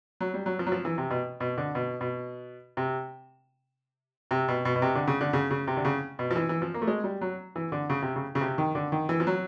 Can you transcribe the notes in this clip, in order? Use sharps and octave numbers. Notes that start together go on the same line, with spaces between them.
F#3
G3
F#3
F3
F#3
F3
E3
C3
B2
B2
D3
B2
B2
C3
C3
B2
B2
B2
C3
D3
C#3
D3
C#3
C#3
C3
D3
C#3
B2
F3
E3
E3
F3
A#3
A3
G#3
G3
F#3
E3
D3
C#3
C3
C#3
C#3
C3
D#3
D3
D#3
E3
F3
F#3